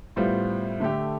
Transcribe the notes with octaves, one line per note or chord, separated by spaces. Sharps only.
A2 G3 B3 F4 C5
D3 A3 D4 G4